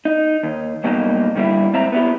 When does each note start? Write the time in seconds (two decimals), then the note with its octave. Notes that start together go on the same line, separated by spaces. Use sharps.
0.05 D#4
0.43 D#2
0.84 G2 B2 F#3 A#3 D#4 G4
1.35 G2 D3 G3 A#3 E4
1.74 G#2 C4 E5 A#5
1.92 B3 E4 G4